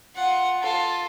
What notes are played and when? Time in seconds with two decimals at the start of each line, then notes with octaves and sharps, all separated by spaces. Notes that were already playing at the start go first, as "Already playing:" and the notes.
0.16 F4 F#5
0.62 F4 A4